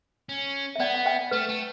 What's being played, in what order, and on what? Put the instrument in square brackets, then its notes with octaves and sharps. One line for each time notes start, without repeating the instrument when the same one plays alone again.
[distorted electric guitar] C#4
[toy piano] E5
[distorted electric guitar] B3 [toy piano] D5 F#5
[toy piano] F#5
E5 G5
[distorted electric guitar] A3 [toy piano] B4
[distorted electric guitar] A3